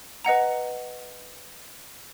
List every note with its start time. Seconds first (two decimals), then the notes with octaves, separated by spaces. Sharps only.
0.25 B4 D#5 F#5 A#5